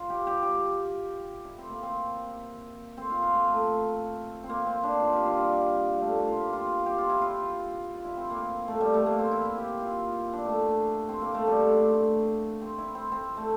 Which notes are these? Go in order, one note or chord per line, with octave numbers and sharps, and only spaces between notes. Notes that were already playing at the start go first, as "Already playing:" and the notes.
Already playing: F4
G4
G4
G4
E4
C4
A#3
C4
C4
F4
F4
A#3
A3
C4
A#3
C4
D4
F4
G4
F4
G3
G3 A3
A#3
F4
G4
F4
G4
F4
E4
F4
F4
E4
C4
A#3
A3
G3
A3
A#3
C4
E4
E4
G4
F4
F4
E4
D4
A3
C4
A#3
A3
G3
A3
D4
C4
A3
C4
E4
C4
C4
A3